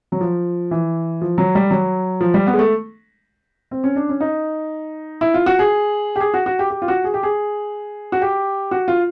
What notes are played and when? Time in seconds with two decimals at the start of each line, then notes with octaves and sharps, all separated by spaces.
0.12 F#3
0.21 F3
0.71 E3
1.21 F3
1.38 F#3
1.55 G3
1.71 F#3
2.21 F3
2.34 G3
2.47 B3
2.54 G#3
2.59 A3
3.71 C4
3.84 C#4
3.96 D4
4.09 C#4
4.21 D#4
5.21 E4
5.34 F4
5.46 F#4
5.59 G#4
6.16 G4
6.20 G#4
6.34 F#4
6.46 F#4
6.59 G4
6.70 G4
6.82 F4
6.88 F#4
7.04 G#4
7.14 G4
7.23 G#4
8.12 F#4
8.22 G4
8.71 F#4
8.88 F4